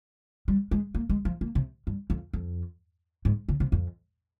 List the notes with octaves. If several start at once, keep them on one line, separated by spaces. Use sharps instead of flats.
G3
G#3
A#3
G#3
F3
A#3
C3
G2
F2
F2
G#2
C#3
C3
F2